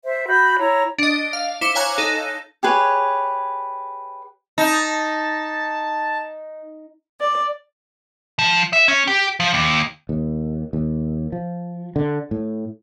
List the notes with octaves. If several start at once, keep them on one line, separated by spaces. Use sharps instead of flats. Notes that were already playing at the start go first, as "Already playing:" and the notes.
C5 E5
F#4 B5 G6
E4 C#5 A#5
D4 D#5
F5
E4 C5 D6 C#7
C#5 F5 G#5 A#5 F#6
D#4 A4
G4 G#4 B4 C#5
D#4 A5
D5
F3
E5
C#4
G4
F3
D#2
D#2
D#2
F3
D3
A2